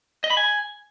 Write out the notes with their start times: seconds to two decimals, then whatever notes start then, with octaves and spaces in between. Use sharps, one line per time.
0.24 D#5
0.30 B5
0.37 G#5